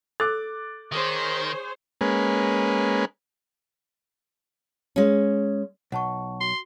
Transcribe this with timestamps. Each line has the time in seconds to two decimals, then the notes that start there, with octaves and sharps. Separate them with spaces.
0.20 A4 D6 F#6 A6
0.92 D#3 G#4 C5 C#5
2.01 G#3 A#3 C#4 B4
4.96 G#3 C#4
5.92 B1 F#5 A5 C#6
6.41 F#4 C6